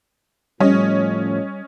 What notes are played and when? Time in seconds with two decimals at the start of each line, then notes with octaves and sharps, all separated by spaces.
0.60 A2 F3 G3 A3 C#4 D#5